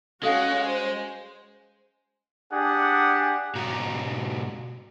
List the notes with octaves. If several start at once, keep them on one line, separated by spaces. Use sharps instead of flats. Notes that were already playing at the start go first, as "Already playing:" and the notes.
G#3 C#4 F#4 A4 F5 F#5 A#5
C5
D4 G4 G#4 F#5
G#2 B2 F#4 A#5